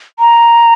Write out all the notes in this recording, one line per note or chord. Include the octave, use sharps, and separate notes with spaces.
A#5